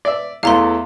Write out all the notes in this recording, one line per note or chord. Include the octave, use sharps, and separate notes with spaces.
D5 E5
E2 E3 A3 F5 A#5 C6